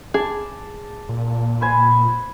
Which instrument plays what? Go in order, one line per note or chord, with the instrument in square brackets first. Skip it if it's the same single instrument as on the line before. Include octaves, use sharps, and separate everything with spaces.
[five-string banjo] G#4 [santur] A5 D6
[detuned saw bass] A#2
[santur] B4 C5 G#5